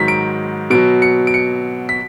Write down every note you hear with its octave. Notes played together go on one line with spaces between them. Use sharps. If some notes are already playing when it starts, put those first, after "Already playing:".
Already playing: G#2 D#3 F#3 B6
D7
B2 F#3 D7
C#7
D7
C#7
B6